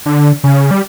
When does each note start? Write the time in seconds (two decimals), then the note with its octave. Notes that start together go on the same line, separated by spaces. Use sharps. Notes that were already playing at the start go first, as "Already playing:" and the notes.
0.06 D3
0.44 C#3
0.71 G3